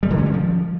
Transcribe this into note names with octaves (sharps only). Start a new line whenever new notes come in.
G3
D3
C#4
G3
F3